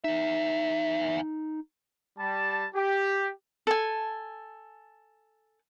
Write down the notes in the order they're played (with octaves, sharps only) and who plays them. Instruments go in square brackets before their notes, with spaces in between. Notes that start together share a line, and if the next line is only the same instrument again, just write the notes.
[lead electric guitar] E2 E5 [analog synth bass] D#4
[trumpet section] G3 A5
G4
[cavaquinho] A4 G#5